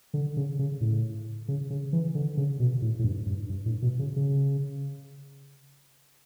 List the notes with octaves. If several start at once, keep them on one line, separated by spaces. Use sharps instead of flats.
D3
C#3
C#3
A2
C#3
C#3
E3
D3
C#3
B2
A2
A2
G2
G2
G2
A2
B2
C#3
C#3